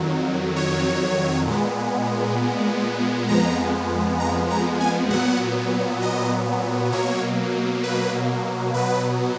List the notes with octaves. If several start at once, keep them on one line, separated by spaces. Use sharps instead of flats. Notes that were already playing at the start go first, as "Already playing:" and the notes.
Already playing: F2 D#3 F#3
C#5
A#2 G#3 B3
F2 F3 G#3 B3 A#5
A#5
A#5
G#5
A#2 F#3 B3 F#5
D#5
B2 F#3 A#3 C#5
B4
B2 F#3 B3 B4